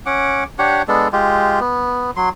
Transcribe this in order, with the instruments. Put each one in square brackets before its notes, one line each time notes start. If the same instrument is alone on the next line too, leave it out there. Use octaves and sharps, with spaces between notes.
[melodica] C#4 F#5 D6
D4 G4 C#5 F#5
G#3 B3 D4 A4
G#3 F4 G4
B3
F#3 C6